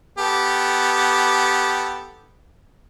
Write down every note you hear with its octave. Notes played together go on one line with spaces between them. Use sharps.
B3 G4 A4